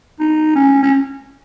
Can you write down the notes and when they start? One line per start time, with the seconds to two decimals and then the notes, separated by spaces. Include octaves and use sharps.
0.20 D#4
0.56 C#4
0.83 C#4